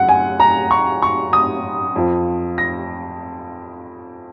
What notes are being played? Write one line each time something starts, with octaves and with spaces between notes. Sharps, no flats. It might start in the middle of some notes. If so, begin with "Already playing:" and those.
Already playing: F#2 C#3 F#3 F#5
G#5
A#5
C#6
C#6
D#6
F2 F3
A#6